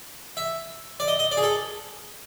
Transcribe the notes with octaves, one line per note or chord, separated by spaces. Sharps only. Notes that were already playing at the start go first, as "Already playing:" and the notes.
E5
D5
D#5
D#5
D5
G#4
A4